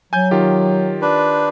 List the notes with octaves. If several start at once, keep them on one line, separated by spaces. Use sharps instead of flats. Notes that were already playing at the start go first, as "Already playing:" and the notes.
F#3 G#5 G6
D#3 F4 G4
D4 B4